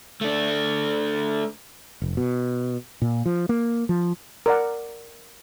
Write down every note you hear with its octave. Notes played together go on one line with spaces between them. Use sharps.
A3 D4
F1
B2
A#2
F3
A#3
F3
A#4 D5 F#5